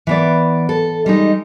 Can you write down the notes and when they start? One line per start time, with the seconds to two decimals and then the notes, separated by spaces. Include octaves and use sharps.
0.07 E3 B3 D5
0.69 A4
1.06 G3 G#3 D#4